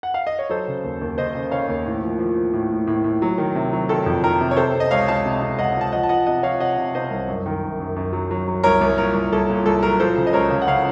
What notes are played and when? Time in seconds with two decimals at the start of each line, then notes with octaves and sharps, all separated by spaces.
0.03 F#5
0.14 F5
0.27 D#5
0.39 C#5
0.49 F#3 A4 C5
0.68 C#3
0.84 D#2
1.01 D#2
1.18 C#3 C5 D#5
1.35 C#3
1.52 C#3 C#5 F5
1.69 D#2
1.86 A2
2.02 F3
2.19 F3
2.37 F3
2.53 A2
2.71 A2
2.87 A2
3.04 A2
3.22 F#3
3.38 D#3
3.55 C3
3.73 F#3
3.89 D#3 A4
4.06 F2
4.23 D#3 A#4
4.41 C3
4.51 C#5
4.56 C3 A4 C5
4.75 C3
4.80 D#5
4.91 C#2 C#5 F5
5.08 C#2 F5 A5
5.25 C3
5.42 C3
5.58 C#2 D#5 F#5
5.76 C#2
5.81 A5
5.92 F3 D#5 F#5
6.03 A5
6.09 F3 D#5 F#5
6.26 C3 D#5 F#5
6.43 F3 C#5 F5
6.60 C3 D#5 F#5
6.78 C3
6.95 C3 C5 D#5
7.11 C2
7.28 F#2
7.46 D#3
7.62 F#2
7.80 F#2
7.96 F#2
8.13 F#3
8.31 F#3
8.48 F#3
8.64 C2 A#4 C#5
8.81 C2
8.98 A#2 A#4
9.14 C2
9.32 C2 A4
9.49 A#2
9.66 C2 A4
9.83 F#3 A#4
10.00 F3 A4 C5
10.16 C#3
10.27 D#5
10.33 C#2 A#4 C#5
10.51 C#3
10.62 F#5
10.67 C#3 C#5 F5